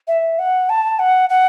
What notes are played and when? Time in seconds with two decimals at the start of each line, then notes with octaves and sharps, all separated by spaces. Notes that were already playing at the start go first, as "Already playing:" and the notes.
0.07 E5
0.38 F#5
0.69 A5
0.99 F#5
1.29 F#5